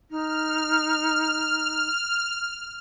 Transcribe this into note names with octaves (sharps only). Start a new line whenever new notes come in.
D#4 F6